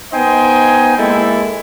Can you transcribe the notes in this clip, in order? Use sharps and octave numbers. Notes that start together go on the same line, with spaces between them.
B3 D#4 C5 D#5 G5 G#5
G#3 A#3 C4 E4 A4